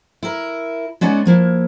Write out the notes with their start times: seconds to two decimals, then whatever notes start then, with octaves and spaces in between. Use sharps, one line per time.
0.23 E4 A#4
1.01 G#3 B3 C#4 D#4 D5 F#5
1.26 F3 A#3 E4